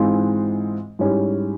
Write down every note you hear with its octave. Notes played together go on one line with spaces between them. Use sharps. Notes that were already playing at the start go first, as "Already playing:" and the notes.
Already playing: G#2 E3 G#3 C4 F4
G#2 G3 C#4 E4 G4